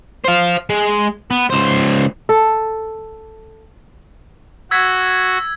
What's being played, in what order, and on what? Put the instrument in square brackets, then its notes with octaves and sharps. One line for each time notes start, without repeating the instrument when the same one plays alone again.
[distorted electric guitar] C5 F5
G#3
B3
C#2 C5
[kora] A4
[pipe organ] F#4 [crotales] E6 G#6 B6